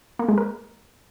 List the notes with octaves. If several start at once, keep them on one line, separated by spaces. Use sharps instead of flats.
A#3
G#3
A#4